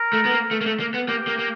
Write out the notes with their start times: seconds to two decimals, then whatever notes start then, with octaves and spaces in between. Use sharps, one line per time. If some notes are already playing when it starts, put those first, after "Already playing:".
Already playing: A#4
0.13 A3
0.25 B3
0.31 A#3
0.51 A3
0.61 A#3
0.66 A3
0.80 A#3
0.94 B3
1.09 A#3 G4
1.27 A#3
1.39 A#3